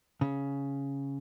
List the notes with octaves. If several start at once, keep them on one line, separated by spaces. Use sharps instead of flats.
C#3